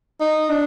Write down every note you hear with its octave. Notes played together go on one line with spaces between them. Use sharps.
D#4
D4